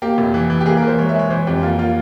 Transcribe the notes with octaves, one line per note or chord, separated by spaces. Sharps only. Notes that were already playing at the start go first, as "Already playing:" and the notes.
A#3 G4
F1
E3
E3
G4
A#3 G#4
A#4
E3
C5
G#3 C#5
E5
G#3 C#5
E3 C5
F2 G4
A#3 F4
A#3 F4